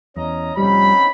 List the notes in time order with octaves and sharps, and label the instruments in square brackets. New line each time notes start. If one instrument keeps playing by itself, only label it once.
[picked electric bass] E2 [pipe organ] C#4 D#5 A#5
[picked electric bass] F1 D#2 G3 [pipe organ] C4 C#4 D#4 [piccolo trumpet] B5